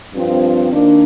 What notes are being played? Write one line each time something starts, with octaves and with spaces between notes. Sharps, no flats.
G2 F3 C4 F4
D#3 A#3 D4